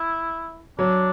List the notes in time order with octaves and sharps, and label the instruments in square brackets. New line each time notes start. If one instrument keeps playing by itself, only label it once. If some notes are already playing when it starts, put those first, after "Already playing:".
Already playing: [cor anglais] E4
[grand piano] F#3 [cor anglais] D4